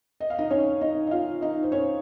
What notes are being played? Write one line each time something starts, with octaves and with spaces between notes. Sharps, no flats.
D#5
F5
D#4 D#5
C#4 C#5
D#4 D#5
D#5
F4 F5
D#4 D#5
C5
C#4 C#5